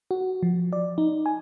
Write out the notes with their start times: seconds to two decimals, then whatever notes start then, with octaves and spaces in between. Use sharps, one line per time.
0.11 F#4
0.43 F3
0.73 D5
0.98 D#4
1.26 G#5